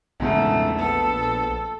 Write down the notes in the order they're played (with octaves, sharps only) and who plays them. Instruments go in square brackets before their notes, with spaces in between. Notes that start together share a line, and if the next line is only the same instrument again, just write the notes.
[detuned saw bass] A#1 [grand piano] E2 G#2 C#3 [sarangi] A3
[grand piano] B3 [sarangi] A4